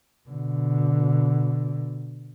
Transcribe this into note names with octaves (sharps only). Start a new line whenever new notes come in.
B2 D3